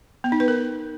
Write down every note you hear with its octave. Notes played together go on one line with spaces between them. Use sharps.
B3
D#4
B4
A#4